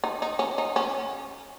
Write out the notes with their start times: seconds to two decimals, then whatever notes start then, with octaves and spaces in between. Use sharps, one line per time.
0.04 D#4
0.22 D#4
0.39 C#4
0.58 D#4
0.76 C#4